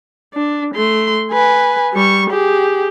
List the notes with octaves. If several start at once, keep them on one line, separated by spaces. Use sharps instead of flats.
D4
A3 C6
B4 G#5
G3 C#6
G4 G#4